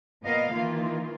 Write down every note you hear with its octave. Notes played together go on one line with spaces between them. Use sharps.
A#2 B3 A#4 D#5 F5
D#3 E3 A#3 F4